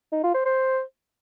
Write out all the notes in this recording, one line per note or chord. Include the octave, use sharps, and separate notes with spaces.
D#4
F4
C5
C5